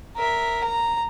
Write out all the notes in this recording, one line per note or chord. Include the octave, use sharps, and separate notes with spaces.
A#4 E5
A#5